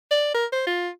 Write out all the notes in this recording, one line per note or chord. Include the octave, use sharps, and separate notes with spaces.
D5
A#4
C5
F4